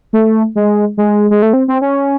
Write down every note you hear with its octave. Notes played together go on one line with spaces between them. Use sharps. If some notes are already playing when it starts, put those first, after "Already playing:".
A3
G#3
G#3
G#3
A3
C4
C4
C#4